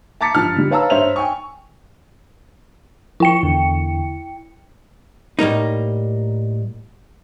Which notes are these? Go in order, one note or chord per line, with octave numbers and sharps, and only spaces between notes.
A5 A#5 D6 A6 B6 C#7
G2 F3 A5 F6
D3 G3
B4 C#5 F5 A5 A#5 E6
G2 C5 C#5 E5 F7
G5 G#5 C#6
F3 E4 G5 C#7
E2 D3
A2 G3 A#3 D#4